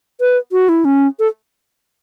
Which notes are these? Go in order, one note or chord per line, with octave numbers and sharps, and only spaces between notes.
B4
F#4
E4
C#4
A4